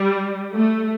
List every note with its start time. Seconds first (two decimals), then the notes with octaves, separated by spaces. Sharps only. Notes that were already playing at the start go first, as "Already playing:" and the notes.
Already playing: G3
0.54 A3